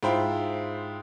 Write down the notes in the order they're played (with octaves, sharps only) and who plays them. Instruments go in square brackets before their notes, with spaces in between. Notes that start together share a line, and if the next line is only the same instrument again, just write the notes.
[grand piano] G#2 E4 F4 C5 G5 B5